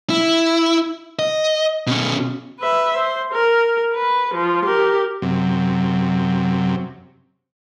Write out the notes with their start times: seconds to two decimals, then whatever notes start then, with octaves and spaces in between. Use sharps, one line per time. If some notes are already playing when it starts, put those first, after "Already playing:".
0.10 E4
1.19 D#5
1.87 B2 C#4
2.60 B4 E5
2.96 C5
3.33 A#4
3.94 B4
4.34 F3
4.65 G4 A#4
5.22 F#2 C3